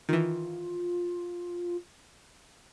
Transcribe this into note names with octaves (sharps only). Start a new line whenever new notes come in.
D#3 E3 F4